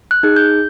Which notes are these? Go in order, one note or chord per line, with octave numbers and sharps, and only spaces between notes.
F#6
D#4 G#4
G6